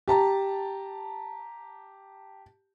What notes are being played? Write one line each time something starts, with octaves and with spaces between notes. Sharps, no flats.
G4 A5 A#5